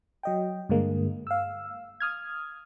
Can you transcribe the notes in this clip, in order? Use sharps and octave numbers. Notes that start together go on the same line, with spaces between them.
F#3 D#5 G5
G2 D3 G#3 A#3
F5 E6
D#6 F6 G#6